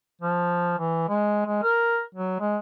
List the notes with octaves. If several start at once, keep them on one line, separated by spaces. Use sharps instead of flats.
F3
E3
G#3
G#3
A#4
F#3
G#3